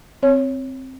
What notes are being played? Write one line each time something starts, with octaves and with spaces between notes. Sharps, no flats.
C4 C#5